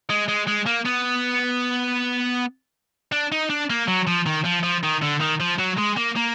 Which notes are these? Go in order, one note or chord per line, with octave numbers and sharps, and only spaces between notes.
G#3
G#3
G#3
A#3
B3
D4
D#4
D4
A#3
F#3
F3
D#3
F3
F3
D#3
D3
D#3
F3
F#3
G#3
A#3
A#3